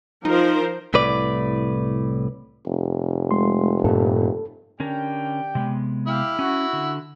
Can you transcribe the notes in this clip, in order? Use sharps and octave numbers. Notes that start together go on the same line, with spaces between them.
F3 D#4 A#4 C5
C2 A2 B4 D5
F1
G#3 A3 C6
G2 A#2 A4
D3 C#4 G4 A#4 D5 G5
C3 G#3 B3
E4 G4 F5 E6
C#4 F#4
D3